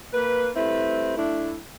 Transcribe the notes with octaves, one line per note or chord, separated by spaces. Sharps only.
A#3 B4
G3 A3 C4 E4 B4
A3 D4 E4